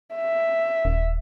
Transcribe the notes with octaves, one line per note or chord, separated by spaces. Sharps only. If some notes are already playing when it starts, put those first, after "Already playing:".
E5
D#1